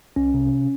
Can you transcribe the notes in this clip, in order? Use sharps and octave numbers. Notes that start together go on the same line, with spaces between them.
C2 C#4
C3